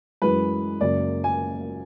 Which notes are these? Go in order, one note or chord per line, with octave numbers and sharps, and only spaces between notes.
F#2 E3 G#3 B4
F#1 F#2 C#3 D5
G#5